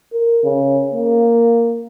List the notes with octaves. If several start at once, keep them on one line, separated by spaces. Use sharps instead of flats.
A#4
C#3
A#3